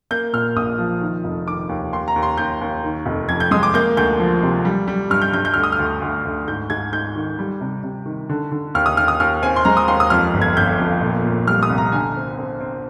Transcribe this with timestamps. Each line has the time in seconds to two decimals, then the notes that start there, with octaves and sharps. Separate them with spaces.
0.11 A#3 G6
0.33 A#2 F6
0.56 A#1 D#6
0.78 F3
1.01 D#3
1.24 F1
1.47 D#3 D6
1.69 D#2
1.93 D#2 C6
2.08 A#5
2.16 D#2
2.22 C6
2.37 D#2 G6
2.61 D#2
2.84 D#3
3.06 F1
3.29 F2 G#6
3.40 G6
3.51 G#3 D#6
3.63 D6
3.74 A#3 G6
3.97 D2 G6
4.20 F3
4.43 C3
4.65 G3
4.88 G3
5.10 G2 F6
5.22 G6
5.33 G2 G6
5.45 G6
5.54 D2 F6
5.63 D#6
5.72 F6
5.79 D2
6.01 D2
6.25 D2
6.48 G#2 G6
6.70 G#2 G#6
6.92 G#2 G6
7.16 D#3
7.39 G3
7.61 C3
7.83 C3
8.06 D#3
8.29 D3
8.51 D3
8.75 D#2 F6
8.86 D#6
8.97 D#2 F6
9.08 D#6
9.20 D#2 F6
9.42 C4 G#5
9.56 C6
9.65 G#3 A#5
9.77 D#6
9.88 D#2 C6
10.00 D#6
10.10 F2 F6
10.34 G1
10.42 G#6
10.57 G1 G6
10.79 F2
11.01 A#2
11.24 A#2
11.47 G3 F6
11.63 D#6
11.70 C2
11.78 A#5
11.92 D3 G#5
12.16 C4
12.38 C4
12.61 C4